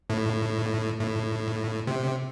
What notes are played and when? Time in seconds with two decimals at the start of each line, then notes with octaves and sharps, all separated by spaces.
0.10 A2
0.99 A2
1.87 C3